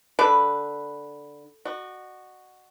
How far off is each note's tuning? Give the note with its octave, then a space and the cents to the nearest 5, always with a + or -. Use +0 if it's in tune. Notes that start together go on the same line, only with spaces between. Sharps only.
D3 +0 B4 +0
F#4 +0 D#5 -45